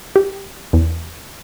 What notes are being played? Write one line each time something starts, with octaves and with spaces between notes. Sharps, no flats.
G4
E2